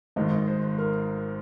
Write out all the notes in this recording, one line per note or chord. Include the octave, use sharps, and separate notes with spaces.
G#1 G#2 D#3 D#5
C5
A#4